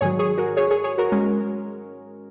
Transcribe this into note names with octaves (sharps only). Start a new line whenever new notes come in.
G#2 D#3 F#3 G#4 C#5
G#4 C#5
F#4 A#4
G#4 C#5
G#4 C#5
G#4 C#5
F#4 A#4
G#3 C#4